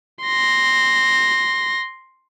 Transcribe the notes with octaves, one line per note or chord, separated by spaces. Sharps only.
C6 A#6